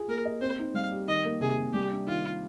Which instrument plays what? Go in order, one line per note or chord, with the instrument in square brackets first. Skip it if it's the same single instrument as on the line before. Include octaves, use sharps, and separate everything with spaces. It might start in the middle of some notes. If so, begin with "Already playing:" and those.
Already playing: [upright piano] F4 G#4
[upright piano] A#3 [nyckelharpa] A#4
[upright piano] D#5
[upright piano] C4 [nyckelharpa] C5
[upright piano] D#4
[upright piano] G3 [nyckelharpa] F5
[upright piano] G4
[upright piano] D#3 [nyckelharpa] D#5
[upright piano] A#3
[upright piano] C3 [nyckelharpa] G#4
[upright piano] C3
[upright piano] G3 [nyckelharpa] G4
[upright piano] D4
[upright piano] D#3 [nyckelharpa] F4
[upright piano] D#3